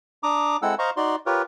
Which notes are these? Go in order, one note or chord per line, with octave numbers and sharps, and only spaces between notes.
D4 A#5 D6 D#6
G#3 C4 E4 A4 F#5 E6
C5 D#5 F5 A#5 C#6
D#4 F#4 D5 C6
F4 G4 A#4 B4 C#5